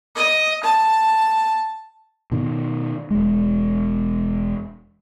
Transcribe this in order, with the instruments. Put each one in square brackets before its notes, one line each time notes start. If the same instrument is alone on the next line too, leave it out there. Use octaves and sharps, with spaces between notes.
[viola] D#5
A5
[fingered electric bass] B2 D#3
E1 G#3